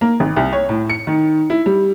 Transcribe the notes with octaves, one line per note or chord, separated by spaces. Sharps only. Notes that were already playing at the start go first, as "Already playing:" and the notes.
A#3
G#1
C2
C#5
A2
C#7
D#3
E4
G3